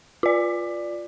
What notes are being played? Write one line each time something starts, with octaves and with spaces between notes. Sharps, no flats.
F4 D5